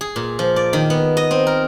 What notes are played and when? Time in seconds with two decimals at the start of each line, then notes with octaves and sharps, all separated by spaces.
0.01 G#4
0.16 A#2
0.39 F3
0.56 D5
0.73 D#3
0.90 B3
1.17 D#5
1.31 C4
1.47 A#4